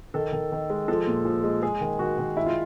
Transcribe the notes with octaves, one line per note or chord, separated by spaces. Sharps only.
D#3 A4
D#3
D#3
G#3
F3 A4
A#2
F3
G#3
G#3 G#4
D#3
D#3 F#4
D#3
G#3 E4
F4